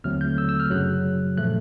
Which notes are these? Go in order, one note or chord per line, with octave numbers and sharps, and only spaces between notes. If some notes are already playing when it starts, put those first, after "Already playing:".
D#2 D3 F#3 A3 C4 F6
G6
E6
E6
F6
F#2 C#3 F#3 F#6
A#2 F3 A3 F#6